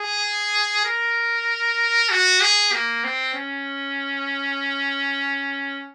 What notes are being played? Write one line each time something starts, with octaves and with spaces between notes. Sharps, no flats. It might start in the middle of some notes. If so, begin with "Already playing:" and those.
Already playing: G#4
A#4
F#4
G#4
A#3
C4
C#4